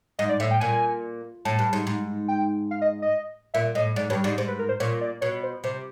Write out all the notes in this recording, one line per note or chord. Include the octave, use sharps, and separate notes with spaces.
G#2 D#5
D5
A2 E5
G5
A#2 G#5
A2 A5
G2
G#2
G#2
G5
F5
D#5
D#5
A#2 E5
A2 D#5
G#2 D5
G2 C#5
G#2 D5
G#2 C5
B4
A#4
C5
A#2 C#5
D5
B2 C#5
C5
C3 C5